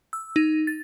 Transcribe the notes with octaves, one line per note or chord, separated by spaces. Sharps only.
E6
D#4
A6